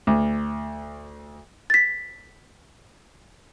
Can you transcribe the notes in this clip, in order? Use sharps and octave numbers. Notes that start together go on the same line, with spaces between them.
D2
A6 B6